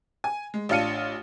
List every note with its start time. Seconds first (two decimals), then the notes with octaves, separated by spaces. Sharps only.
0.24 G#5
0.54 G#3
0.69 A1 D4 F4 F6 C#7 D#7